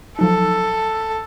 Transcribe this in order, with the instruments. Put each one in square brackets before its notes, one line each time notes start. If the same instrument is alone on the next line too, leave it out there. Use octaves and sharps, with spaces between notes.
[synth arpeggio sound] F3 F#3 D#4 [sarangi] A4